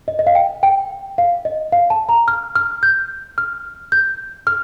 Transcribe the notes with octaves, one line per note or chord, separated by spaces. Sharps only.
D#5
D#5
F5
G5
G5
F5
D#5
F5
A5
A#5
F6
F6
G6
F6
G6
F6